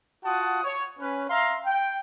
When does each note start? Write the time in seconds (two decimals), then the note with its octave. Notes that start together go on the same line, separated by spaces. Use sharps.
0.25 F4 F#4 F#5 A5 D#6
0.64 C#5
1.00 C#4 B4
1.30 E5 F5 A#5 C6
1.66 G5